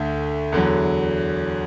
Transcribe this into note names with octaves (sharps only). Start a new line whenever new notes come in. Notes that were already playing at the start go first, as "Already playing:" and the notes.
Already playing: D2 D3 A3
E2 D3 F#3